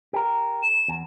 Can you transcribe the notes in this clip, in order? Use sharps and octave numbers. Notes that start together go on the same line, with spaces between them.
G4 A#4
E7
E2